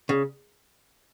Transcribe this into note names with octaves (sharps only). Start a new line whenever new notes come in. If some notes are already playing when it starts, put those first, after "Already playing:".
C#3